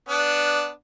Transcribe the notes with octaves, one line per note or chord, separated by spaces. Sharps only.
B3 D4